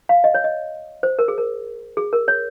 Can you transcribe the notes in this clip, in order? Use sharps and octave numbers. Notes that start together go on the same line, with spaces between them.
F5
D#5
C#5
D#5
C5
A#4
G#4
A#4
G#4
A#4
C#5